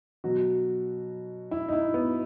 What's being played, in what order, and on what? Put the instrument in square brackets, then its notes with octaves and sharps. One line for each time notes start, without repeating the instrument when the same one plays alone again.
[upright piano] B2 F#3 F#4
E4
D#4
E4
B3